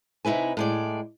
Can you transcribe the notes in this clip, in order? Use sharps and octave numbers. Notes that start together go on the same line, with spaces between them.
C3 D#4 E4 B4 G#5
A2 G#3 D5